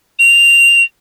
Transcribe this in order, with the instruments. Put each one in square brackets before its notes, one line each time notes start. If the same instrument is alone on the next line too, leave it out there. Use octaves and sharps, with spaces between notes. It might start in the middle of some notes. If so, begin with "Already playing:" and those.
[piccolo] F7